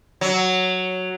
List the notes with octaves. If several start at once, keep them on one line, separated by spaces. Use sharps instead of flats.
F#3